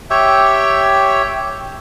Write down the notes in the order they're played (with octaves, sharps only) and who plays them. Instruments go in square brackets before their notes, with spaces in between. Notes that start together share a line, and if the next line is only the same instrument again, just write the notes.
[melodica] G4 C#5 E5 G5